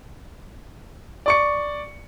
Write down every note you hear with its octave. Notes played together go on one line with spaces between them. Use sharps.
D5 C#6 C#7